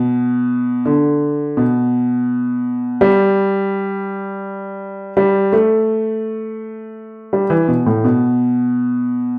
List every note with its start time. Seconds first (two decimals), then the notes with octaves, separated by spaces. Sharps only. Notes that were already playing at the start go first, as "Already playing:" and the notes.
Already playing: B2
0.85 D3
1.57 B2
3.01 G3
5.17 G3
5.52 A3
7.33 G3
7.50 E3
7.68 B2
7.86 A2
8.04 B2